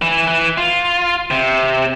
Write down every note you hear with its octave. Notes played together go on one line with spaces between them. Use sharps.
E3
E3
F4
C3